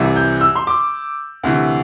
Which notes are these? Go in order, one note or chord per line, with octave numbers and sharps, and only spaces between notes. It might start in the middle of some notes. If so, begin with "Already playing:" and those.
Already playing: C2 C3 E3
G6
E6
C6
D6
D2 C3 E3